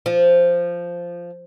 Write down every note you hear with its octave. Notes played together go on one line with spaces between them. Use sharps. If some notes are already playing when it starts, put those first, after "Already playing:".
F3